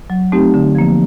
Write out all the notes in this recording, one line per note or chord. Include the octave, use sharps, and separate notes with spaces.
F#3
A3 C4 D#4 G4
D3
F3 A#3